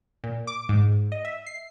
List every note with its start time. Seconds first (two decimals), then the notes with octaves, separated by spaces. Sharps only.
0.24 A#2
0.47 D6
0.69 G#2
1.12 D#5
1.25 E5
1.46 C7